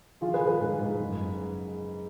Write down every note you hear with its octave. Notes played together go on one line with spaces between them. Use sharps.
F3 F4 G#4
G#4 B4
F3
G#4 B4
G#2
G#2
F#1